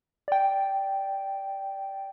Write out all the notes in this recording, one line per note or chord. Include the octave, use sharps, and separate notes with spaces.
D5 G5